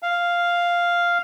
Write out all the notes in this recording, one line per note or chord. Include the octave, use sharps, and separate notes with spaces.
F5